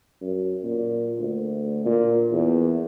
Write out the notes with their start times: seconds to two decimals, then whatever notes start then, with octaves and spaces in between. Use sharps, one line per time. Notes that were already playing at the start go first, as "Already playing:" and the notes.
0.22 F#2
0.64 A#2
1.18 D2
1.85 A#2
2.32 E2